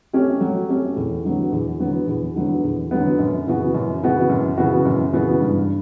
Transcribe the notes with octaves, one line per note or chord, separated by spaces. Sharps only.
A3 C#4 G4
F#3
A3 C#4 G4
E2
D3 F#3 B3
E2
D3 F#3 B3
E2
D3 F#3 B3
E2
D3 F#3 B3
F#2
C#3 E3 B3 F#4
F#2
C#3 E3 B3 F#4
F#2
C#3 E3 B3 F#4
F#2
C#3 E3 B3 F#4
G2